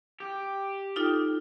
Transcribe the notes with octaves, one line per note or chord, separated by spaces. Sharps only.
G4
D#4 F4 A4